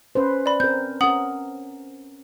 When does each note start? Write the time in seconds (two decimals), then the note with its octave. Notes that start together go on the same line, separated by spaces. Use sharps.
0.15 C#4 B4 C5
0.46 D5 B5
0.60 C4 A#4 G6
1.01 C#4 A#4 F#5 D#6 F#7